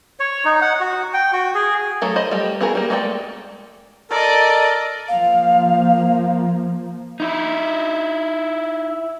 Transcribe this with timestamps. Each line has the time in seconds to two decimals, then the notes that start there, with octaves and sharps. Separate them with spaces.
0.20 C#5
0.45 D#4
0.61 F#5
0.80 F#4
1.14 G5
1.33 F#4
1.55 G#4
2.02 F#3 A3 A4 A#4
2.16 C5 D#5 B5
2.31 G3 A3 G5
2.61 B3 E4 F#4 G#4 A#4
2.75 G3 A#3
2.90 G#3 A3 A4 D5 G5
4.11 A4 A#4 D5 D#5
5.08 F3 A#3 F5
7.20 D#4 E4